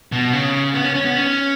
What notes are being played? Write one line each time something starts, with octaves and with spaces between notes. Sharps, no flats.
B2
C#3
B3
C#4
C#4
B3
C#4